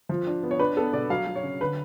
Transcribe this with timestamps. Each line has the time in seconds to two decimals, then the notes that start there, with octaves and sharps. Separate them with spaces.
0.09 F3
0.27 D4
0.43 B3
0.51 C#5
0.59 D4 B4
0.77 B3 A4
0.93 B2 D5
1.10 F#3 F5
1.27 F#3
1.36 C#5
1.43 C#3
1.60 D3 B4